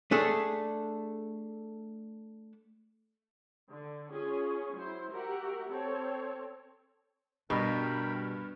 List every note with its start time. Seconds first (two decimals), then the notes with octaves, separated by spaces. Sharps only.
0.11 A3 D4 G#4 A4
3.70 D3
4.12 C#4 F4 G#4
4.75 F#3 E4 C5
5.11 F#4 G4 A#4 E5 F#5
5.68 C4 A4 C#5
7.50 G2 B2 D4 A#4 G5 B5